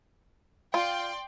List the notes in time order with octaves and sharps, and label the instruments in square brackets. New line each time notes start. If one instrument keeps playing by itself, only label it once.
[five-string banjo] F4 [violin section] D5 G5 C6